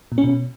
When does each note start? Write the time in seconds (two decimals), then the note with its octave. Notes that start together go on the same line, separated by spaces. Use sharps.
0.12 A#2
0.18 C#4
0.24 B2